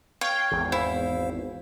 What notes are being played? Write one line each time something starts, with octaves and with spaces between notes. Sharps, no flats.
C#5 F5 G5
G#1 E2
E4 C5 F5